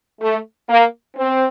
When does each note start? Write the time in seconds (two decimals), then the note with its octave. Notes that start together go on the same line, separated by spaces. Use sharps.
0.21 A3
0.69 A#3
1.17 C4